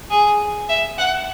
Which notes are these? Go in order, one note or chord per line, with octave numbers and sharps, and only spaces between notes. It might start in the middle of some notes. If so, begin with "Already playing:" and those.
G#4
E5
F#5